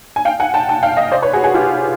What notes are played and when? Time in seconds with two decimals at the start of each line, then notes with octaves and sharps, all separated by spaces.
0.16 G#5
0.25 F5 G5
0.40 F#5 G#5
0.54 G5 A5
0.69 G5 A5
0.83 F5 G5
0.97 D#5 F5
1.11 C5 D5
1.22 B4 C#5
1.33 F#4 G#4
1.44 F#4 G#4
1.54 F4 G4